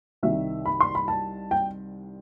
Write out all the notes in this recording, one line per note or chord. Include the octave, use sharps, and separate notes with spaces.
C2 C3 D#3 G3 E5
B5
C6
B5
A5
G5